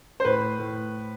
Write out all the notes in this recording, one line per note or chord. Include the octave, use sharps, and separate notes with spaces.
C5
A2 B4
A2